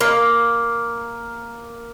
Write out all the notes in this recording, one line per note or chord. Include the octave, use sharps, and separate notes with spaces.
A#3